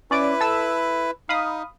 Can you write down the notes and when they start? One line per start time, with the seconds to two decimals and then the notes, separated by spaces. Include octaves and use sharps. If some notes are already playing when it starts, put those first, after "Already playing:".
0.11 C#4 E4 B4 D5 D6
0.41 A4 E6
1.29 D#4 F5 B5 D#6